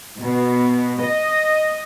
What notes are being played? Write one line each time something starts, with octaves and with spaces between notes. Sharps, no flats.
B2
D#5